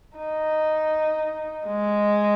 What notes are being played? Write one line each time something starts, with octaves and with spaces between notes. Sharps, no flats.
D#4
G#3